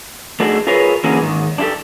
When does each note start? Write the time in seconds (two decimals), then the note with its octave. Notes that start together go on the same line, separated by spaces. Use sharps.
0.40 A3 D4 D#4 F#4 G#4
0.67 F4 G#4 A#4 B4 C#5
1.04 D3 E3 A#3 C#4 F#4 G#4
1.22 G#2 D#3
1.58 D4 E4 F4 G4 A4